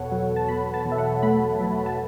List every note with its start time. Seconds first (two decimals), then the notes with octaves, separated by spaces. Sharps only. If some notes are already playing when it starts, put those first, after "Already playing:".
Already playing: E2 B2 A4 B4 C#5 F#5
0.12 F#3
0.36 A5
0.48 B2 B5
0.74 A5
0.85 E2
0.92 E5
0.98 F#5
1.23 A3 B5
1.61 F#3
1.86 A5